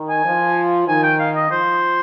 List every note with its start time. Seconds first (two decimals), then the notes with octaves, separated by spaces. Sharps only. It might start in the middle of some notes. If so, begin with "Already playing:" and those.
Already playing: D#3
0.09 G#5
0.25 F3
0.88 D#3 G#5
1.03 G5
1.19 F5
1.36 D#5
1.51 F3 C5